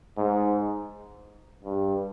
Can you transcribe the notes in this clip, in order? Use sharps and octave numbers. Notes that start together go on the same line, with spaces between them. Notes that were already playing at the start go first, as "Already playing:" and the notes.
G#2
G2